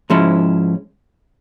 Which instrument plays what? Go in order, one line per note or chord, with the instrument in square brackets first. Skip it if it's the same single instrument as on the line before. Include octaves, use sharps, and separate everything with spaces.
[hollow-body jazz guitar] G#2 F3 G#3 C#4 E4